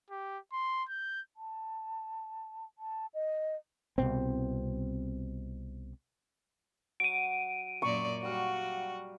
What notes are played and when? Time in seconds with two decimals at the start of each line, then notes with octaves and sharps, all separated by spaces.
0.11 G4
0.53 C6
0.89 G6
1.37 A5
2.78 A5
3.14 D#5
3.98 C2 B2 C4
7.00 F#3 D7 D#7
7.82 F#2 A#2 D5 A#5 C#6
8.23 F#3 G3 F#4 F5